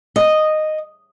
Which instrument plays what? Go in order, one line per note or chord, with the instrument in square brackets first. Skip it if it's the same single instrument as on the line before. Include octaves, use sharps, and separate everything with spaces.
[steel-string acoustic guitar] D#5